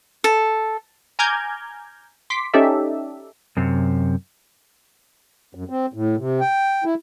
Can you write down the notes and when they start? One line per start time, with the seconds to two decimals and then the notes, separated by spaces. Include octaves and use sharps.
0.24 A4
1.19 G#5 A#5 D6 F6 G6 G#6
2.30 C6 D6 B6
2.54 C#4 D#4 G4 A4 D5 E5
3.57 F#2 C3
5.55 F#2
5.70 C4
5.94 A2
6.17 C3
6.41 G5
6.84 E4